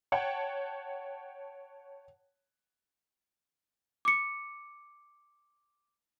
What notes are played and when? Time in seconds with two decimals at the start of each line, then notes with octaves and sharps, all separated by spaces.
0.12 C#5 F#5 G5 A5
4.05 D6 C#7